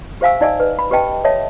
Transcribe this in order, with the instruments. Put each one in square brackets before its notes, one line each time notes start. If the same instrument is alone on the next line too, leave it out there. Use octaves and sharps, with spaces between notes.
[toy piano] G4 C5 E5 F5 G#5 E6
D#4 D5 D#5 G#5 E6
B4
B5
G4 B4 D#5 G5 A5
A4 C#5 D#5 E5 A5